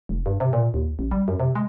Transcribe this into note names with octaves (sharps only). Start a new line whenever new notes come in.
F1
G2
C3
A#2
D#2
A1
G3
F#2
C3
G#3